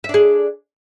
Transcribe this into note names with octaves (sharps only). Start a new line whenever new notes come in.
D4 G#4 E5